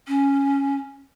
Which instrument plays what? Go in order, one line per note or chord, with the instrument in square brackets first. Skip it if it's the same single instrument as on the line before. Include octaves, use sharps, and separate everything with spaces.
[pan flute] C#4